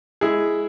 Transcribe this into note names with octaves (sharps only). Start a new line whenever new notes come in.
G#3 E4 G#4